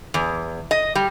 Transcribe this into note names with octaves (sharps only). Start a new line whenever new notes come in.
E2
D#5
G3